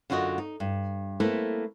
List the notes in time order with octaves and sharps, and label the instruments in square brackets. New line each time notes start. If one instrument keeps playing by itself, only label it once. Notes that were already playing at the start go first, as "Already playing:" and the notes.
[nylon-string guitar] F#2 D3 F4 F#4 A#4 D#5
D#4
G2
A3 A#3 C4 E4 A4 B4